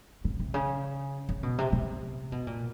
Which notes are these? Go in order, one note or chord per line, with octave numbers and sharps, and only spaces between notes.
C3
C3
C#3
C#3
B2
C3
C3
B2
A#2